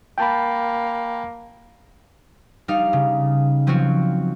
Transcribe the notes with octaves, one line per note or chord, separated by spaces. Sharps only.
A#3 G5 A5 B5
G3 D#4 F5
C#3
F3 F#3 C4 F4 F#4